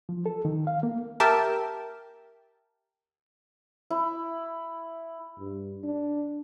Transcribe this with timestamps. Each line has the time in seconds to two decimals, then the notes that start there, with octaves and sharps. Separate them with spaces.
0.09 F3
0.26 A4
0.45 D#3
0.67 F5
0.83 A#3
1.20 G4 A#4 E5 G5 A5
3.90 E4
5.40 G2
5.84 D4